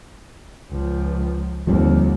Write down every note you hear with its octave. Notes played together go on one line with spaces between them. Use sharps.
C#2 F3
D#2 D3 F3 G3 C4